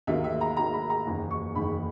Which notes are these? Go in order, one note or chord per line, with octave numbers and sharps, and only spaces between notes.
D#2 D#3 F#3 A#3 E5
E5
A#5
D#2 D#3 F#3 A#3 A#5
B5
A#5
F#1 E2 D#3
C#6
F#1 E2 D#3 B5